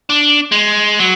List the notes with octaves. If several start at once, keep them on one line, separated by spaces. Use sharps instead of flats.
D4
G#3
F#3